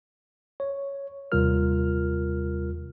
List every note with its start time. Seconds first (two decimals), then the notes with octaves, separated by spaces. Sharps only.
0.60 C#5
1.32 D#2 C3 G3 F4 A#4 F6